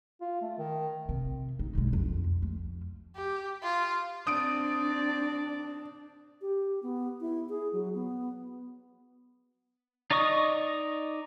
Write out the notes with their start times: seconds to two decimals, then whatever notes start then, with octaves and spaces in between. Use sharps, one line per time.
0.21 F4
0.42 A3
0.59 D#3
1.09 C3
1.59 D#4
1.75 B1 G#3
1.93 F2
2.42 F2
3.15 G4
3.63 F4
4.27 C4 D4 D5 D#6 D7
6.41 G4
6.83 B3
7.21 E4
7.49 G#4
7.73 F#3
7.95 B3
10.11 D#4 D5 D#5 C#6 D#6